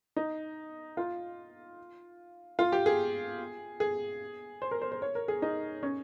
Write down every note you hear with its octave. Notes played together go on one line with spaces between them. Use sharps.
D#4
F4
F4
G4
G#4
G#4
C5
A#4
C5
C5
C#5
A#4
G#4
D#4
C#4